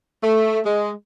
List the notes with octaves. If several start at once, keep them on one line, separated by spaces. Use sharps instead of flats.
A3
G#3